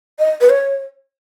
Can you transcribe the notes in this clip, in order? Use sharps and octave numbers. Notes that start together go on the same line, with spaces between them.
D#5
B4
C#5